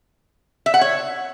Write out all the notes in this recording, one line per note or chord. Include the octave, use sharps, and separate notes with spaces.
E5
F#5
C#5